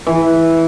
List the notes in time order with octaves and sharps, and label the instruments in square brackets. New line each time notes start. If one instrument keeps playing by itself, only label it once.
[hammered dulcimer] E3